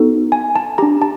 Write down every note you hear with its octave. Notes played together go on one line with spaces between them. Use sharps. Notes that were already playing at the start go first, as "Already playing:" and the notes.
Already playing: B3 D#4 F#4 A4
G#5
A5
D4 G4 A#5
A5